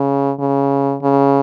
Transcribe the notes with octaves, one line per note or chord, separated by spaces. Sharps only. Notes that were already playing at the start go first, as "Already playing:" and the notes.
Already playing: C#3
C#3
C#3